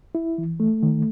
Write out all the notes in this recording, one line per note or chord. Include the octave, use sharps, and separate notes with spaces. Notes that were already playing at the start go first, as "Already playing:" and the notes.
E4
E3
A3
D#3